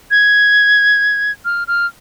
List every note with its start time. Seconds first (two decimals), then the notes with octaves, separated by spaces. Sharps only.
0.11 G#6
1.45 F6
1.68 F6